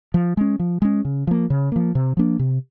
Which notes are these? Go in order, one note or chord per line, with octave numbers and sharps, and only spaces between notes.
F3
G#3 C#4
F3
G#3 C#4
C#3
F3 A#3
C#3
F3 A#3
C3
F3 A#3 D4
C3